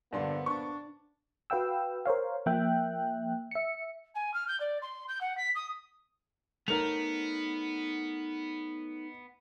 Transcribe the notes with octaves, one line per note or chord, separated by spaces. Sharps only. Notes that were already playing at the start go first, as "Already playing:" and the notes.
G2 D3 F3 A#3 B3 D4 C6
D4 C#6
F#4 B4 F5 G5 E6
A#4 C5 C#5 F5
F3 A#3 E5 G5 F#6
E5 C#7
G#5
F6
G6
D5
C6
G6
F#5
B6
D#6
A3 B3 D#4 A#4 C#5 F7